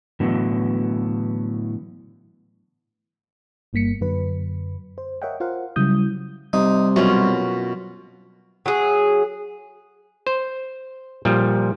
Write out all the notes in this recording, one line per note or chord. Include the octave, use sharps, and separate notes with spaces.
A2 D3 E3 F#3 B3
G1 G2 A#3 B6 C#7
F#2 D3 F#3 B4
C5
A#4 C#5 D#5 E5 F#5 G5
F4 A#4 C5 F5 F#5
C#3 F#3 G3 E4 D#6 G6
C3 G3 D#4
F#2 B2 C#4 F4
F#3 G#4
C5
A#2 F3 G3